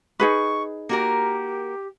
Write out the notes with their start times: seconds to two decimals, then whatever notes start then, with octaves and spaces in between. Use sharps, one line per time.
0.19 D#4 G#4 B4 C#6
0.89 A#3 F#4 G4 A#4